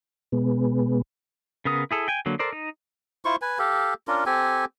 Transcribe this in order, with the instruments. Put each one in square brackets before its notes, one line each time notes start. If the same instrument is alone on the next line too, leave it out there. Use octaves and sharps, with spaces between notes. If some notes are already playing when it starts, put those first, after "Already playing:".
[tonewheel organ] B2 G#3 B3
[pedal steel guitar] C#3 B3 A#4 D#6
E4 G#4 A4
G5 G#5
D3 F#3 A#3
A4 A#4 C5 D5
D#4
[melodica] E4 F4 C5 C#6
B4 G#5
G4 A4 F5
C#4 D4 F4 A#4
C4 G4 A4 G#5